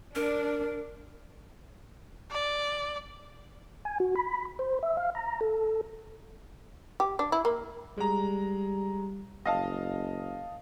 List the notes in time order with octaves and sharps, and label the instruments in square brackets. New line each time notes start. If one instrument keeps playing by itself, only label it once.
[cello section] D4 [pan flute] A#4
[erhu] D5
[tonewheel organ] G#5
F#4
B5
C5
E5
F5
A#5
A4
[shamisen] G4
D4
E4
A#3
[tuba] G3 [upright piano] G#3 A#5
[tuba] F#1 [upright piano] D#5 F5 A5